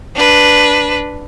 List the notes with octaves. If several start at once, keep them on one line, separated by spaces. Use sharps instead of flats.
D4 B4